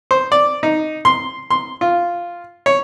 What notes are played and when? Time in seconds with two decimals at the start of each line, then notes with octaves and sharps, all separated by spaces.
0.11 C5
0.32 D5
0.63 D#4
1.05 C6
1.50 C6
1.81 F4
2.66 C#5